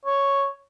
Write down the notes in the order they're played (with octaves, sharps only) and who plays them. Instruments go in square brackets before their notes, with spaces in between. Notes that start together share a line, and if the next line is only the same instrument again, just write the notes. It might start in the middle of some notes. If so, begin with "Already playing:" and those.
[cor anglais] C#5